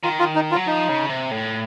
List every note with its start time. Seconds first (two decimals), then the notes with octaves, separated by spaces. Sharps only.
0.03 D#3 F4
0.20 F4
0.35 D#4
0.51 F4
0.56 F#3
0.67 F3 D#4
0.89 C#3
1.09 C3
1.31 A2